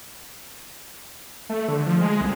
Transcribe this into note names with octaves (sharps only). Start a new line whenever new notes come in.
A3
D3
F3
G#3
C2